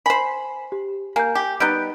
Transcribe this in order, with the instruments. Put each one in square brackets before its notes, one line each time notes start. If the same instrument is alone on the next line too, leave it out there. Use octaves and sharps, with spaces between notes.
[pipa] C5 B5 [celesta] G#5
[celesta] G4
[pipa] A#3 [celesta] G#5 G6
[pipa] G4
[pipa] G3 B3 D#4 [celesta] F#6 G6 D7